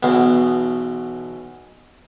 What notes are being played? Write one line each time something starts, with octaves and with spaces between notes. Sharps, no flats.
B1 E2 B2